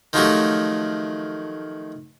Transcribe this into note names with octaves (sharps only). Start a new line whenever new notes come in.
D#3 F3 F#3 A3 F#4 G4